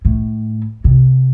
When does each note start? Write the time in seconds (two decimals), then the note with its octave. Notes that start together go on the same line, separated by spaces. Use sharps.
0.05 A2
0.84 C3